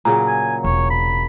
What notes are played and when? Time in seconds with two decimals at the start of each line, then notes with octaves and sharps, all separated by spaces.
0.05 A#2 C#3 F#3 A#5
0.28 G#5
0.64 E1 C#5
0.90 B5